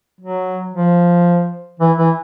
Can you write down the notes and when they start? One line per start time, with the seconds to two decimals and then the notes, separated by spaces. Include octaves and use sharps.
0.21 F#3
0.74 F3
1.80 E3
1.98 E3